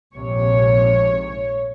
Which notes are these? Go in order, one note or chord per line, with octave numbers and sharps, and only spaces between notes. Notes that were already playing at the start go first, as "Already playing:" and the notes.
A#1 G#2 C3 C#5